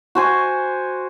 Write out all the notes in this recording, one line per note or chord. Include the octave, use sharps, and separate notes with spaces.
F#4 C5 G#5